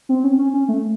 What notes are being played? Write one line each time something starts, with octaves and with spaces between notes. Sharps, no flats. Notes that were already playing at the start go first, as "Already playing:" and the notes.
C4
C#4
C#4
C#4
A3